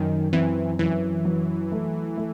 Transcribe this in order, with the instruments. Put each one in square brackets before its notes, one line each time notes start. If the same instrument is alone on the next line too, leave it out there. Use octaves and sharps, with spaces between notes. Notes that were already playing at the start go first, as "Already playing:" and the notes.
Already playing: [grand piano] F#2 [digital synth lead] D#3
[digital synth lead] E3 [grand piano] C4
[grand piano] F#2 [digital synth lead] E3
[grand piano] F#3
A3
A3